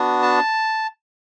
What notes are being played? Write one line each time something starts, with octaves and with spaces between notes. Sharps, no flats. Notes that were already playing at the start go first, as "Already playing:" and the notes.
Already playing: B3 D4 F#4
A5